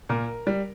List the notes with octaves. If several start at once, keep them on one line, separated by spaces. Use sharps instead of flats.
A#2 A#4
G3